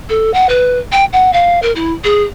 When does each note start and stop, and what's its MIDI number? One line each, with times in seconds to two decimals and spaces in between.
0.09 0.33 69
0.33 0.46 78
0.49 0.79 71
0.92 1.04 79
1.13 1.32 78
1.33 1.59 77
1.62 1.72 70
1.75 1.93 64
2.04 2.23 68